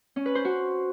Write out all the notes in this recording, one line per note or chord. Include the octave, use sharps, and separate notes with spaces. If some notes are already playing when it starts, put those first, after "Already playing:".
C#4
B4
C5
F#4